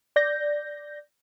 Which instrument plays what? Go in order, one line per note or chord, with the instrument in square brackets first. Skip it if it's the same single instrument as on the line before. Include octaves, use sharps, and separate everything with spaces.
[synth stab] D5 G6 A#6